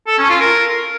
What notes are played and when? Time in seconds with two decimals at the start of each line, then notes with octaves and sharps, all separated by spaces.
0.07 A4
0.18 C#4
0.29 F4
0.40 A#4